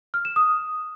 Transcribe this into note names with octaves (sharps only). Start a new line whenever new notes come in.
F6
E7
D#6